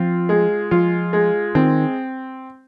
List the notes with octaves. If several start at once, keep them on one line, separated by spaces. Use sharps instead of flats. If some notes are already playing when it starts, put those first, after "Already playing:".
Already playing: F3 C4 F4
G#3
F3 F4
G#3
D#3 C4